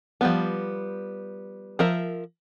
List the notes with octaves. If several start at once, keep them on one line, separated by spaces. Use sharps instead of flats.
F3 G3 B3
F3 A#4 E5